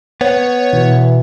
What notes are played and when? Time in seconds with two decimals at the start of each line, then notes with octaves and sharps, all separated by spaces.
0.21 B3 C#5
0.73 B2 E3